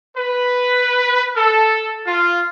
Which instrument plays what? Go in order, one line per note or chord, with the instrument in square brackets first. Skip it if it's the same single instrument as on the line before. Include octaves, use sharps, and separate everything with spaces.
[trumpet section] B4
A4
F4